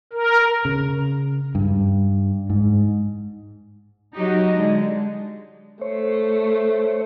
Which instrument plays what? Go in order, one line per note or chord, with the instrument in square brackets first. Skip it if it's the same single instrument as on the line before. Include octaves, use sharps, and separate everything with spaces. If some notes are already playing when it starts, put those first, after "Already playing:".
[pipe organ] A#4
[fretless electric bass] C#3
G2
G#2
[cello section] F#3 D#4 F#4 G4 D#5
D3 G#3
[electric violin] A3 [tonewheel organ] C5 C#5